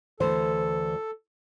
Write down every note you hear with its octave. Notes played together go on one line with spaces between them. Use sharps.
D2 E3 A4 C5